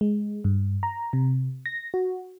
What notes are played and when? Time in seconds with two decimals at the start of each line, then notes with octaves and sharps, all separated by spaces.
0.01 G#3
0.44 G2
0.83 A#5
1.13 C3
1.66 A#6
1.94 F#4